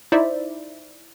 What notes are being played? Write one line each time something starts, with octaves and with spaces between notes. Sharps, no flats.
D#4 E4 C5 D5 E5